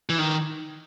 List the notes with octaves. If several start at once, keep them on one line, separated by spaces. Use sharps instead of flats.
E3
D#3